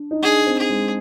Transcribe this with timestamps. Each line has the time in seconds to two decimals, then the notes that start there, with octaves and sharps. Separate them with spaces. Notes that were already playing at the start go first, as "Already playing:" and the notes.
Already playing: D4
0.11 D#4
0.22 D4 G#4
0.46 C4
0.58 G#4
0.70 G#3